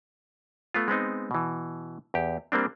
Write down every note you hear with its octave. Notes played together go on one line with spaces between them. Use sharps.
A3 B3 F4
G#3 B3 C4 D#4
B2 E3
E2 G4
G3 A#3 C4 D4